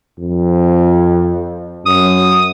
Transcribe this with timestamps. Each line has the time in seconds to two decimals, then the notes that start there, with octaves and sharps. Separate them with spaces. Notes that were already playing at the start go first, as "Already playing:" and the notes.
0.19 F2
1.86 F#2 D#6